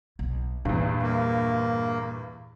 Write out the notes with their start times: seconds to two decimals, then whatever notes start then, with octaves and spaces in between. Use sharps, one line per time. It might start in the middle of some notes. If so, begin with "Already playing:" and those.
0.19 B1
0.65 E2 G2 A#2
1.02 A#3